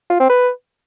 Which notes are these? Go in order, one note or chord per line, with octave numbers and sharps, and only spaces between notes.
F4
C4
B4